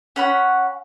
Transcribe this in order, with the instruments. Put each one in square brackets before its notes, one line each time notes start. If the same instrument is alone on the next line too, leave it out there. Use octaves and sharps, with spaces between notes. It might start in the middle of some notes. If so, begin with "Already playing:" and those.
[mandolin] C#4 F#5 B5